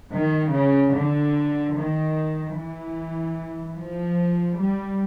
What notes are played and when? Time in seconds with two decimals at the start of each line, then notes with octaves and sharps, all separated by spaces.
0.11 D#3
0.52 C#3
0.93 D3
1.74 D#3
2.55 E3
3.78 F3
4.58 G3